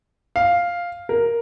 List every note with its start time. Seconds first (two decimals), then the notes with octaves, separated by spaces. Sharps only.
0.36 F5
1.09 A#4